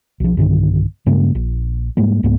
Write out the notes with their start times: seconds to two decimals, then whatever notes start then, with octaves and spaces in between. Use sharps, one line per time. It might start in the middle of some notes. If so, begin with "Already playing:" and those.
0.20 B1 F3
0.37 B1 G2 D3 D#3
1.06 G2 C#3 G#3 A#3
1.35 A#1
1.97 G#2 G3 G#3 A#3
2.23 C#2 G#2 A#3 B3